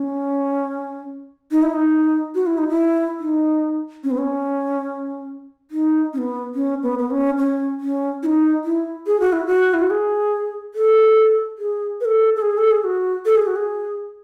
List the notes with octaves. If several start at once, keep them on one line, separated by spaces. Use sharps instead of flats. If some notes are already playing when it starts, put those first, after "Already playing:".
Already playing: C#4
D#4
E4
D#4
F#4
E4
D#4
E4
D#4
C#4
B3
C#4
D#4
C#4
B3
C#4
B3
B3
C#4
C#4
C#4
E4
D#4
E4
G#4
F#4
E4
F#4
E4
F#4
G#4
A4
G#4
B4
A4
A4
G#4
A4
G#4
F#4
A4
G#4
F#4
G#4